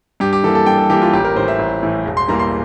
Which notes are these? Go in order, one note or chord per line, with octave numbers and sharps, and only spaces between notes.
G2 G4
G4
E3 A#3 A4
A4
G2 G5
A4
E3 A#3 G4
F4
A1 G4
A#4
A2 E3 C5
E5
A1
A2 E3
E1
C6
E2 E3 G3 A#3 A#5
C6